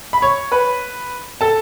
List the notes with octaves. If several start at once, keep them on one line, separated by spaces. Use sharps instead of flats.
B5
C#5 C#6
B4 B5
A4 A5